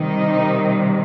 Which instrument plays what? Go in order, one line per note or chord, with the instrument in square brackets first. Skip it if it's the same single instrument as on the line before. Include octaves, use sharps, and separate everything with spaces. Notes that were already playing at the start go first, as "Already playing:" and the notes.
Already playing: [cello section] C3 D#3 G3 D#4